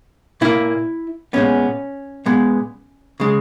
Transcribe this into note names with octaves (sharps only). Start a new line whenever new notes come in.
A#2 A#3 E4
A#2 G#3 B3 C#4
A#2 G#3 B3
C#3 G#3